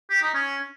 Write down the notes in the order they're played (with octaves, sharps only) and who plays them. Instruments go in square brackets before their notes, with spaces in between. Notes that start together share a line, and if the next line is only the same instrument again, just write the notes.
[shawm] G4
D#4
C#4